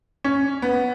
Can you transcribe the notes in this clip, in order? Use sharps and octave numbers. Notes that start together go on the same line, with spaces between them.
C#4
B3